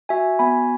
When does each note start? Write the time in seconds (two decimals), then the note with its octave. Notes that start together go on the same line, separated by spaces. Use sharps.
0.09 F#4 E5 G#5
0.39 B3 G#5 B5